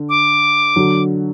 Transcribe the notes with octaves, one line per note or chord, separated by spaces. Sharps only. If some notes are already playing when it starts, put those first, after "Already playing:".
Already playing: D3
D6
D3 F#3